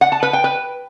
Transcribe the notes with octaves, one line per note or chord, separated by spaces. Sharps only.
F#5
A5
B4
G5
B4